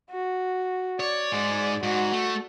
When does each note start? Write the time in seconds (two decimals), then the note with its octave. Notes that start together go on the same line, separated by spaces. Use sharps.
0.10 F#4
1.00 C#5 D5
1.32 G#2 G#3
1.83 G#2 F#4
2.13 A3